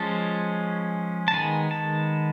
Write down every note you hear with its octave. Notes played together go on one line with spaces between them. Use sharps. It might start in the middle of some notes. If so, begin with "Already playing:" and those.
Already playing: F3 G#3 C#4 A5
A5
D#3 G#3 B3 G#5
A5